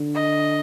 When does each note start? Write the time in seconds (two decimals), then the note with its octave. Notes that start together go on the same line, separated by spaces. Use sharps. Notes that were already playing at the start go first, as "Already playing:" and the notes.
Already playing: D3
0.15 D#5